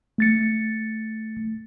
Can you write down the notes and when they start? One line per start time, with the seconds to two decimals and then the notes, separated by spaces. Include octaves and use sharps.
0.18 A3 A6 C#7